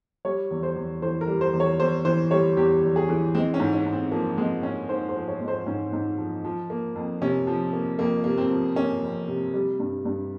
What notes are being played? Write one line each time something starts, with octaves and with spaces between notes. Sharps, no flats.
G3 C#5
E2
C5
E2
E3 C5
A#4
G3
C5
E2
C#5
E2 C5
E3 C5
G3 C#5
E2 G4
E2
G#4
E3
G#3 C4
C#4
G#2
C#4
G#2
C4
F3 A#3
G#3 C4
G#2 C#4
G#2 C5
C5
F3
C#5
G#3
C5
G#2 C#4
G#2
F3
F3
A#3
F2
C3 C#4
F3
A#3
F2 A#3
C3 A#3
C4
F3
A#3 C#4
F2
C3
G3
G2
G2